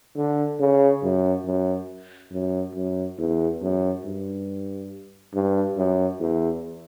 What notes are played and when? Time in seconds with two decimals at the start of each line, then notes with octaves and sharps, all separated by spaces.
0.16 D3
0.60 C#3
1.03 F#2
1.46 F#2
2.32 F#2
2.75 F#2
3.18 E2
3.62 F#2
4.05 G2
5.34 G2
5.77 F#2
6.20 E2